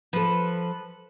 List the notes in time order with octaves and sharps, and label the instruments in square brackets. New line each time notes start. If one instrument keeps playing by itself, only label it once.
[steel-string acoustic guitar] F3 A4 [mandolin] B4